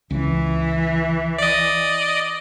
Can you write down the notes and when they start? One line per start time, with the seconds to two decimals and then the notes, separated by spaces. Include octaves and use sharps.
0.10 C#2 E3
1.38 D5 D#5